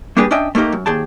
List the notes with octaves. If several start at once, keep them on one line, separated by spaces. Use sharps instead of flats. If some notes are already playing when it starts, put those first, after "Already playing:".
G3 A#3 D4 G4 G#4 B4
C#4 D4 D#5 E5 G5 G#5
A3 A#3 D#4 G4 A#4
F#2
D#2 G#4 G5 A5